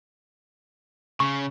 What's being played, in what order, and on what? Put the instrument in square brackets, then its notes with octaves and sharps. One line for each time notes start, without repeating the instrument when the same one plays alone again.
[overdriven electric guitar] C#3 [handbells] C#6